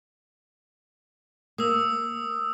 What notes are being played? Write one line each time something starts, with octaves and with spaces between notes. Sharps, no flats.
A#3 D#6 E6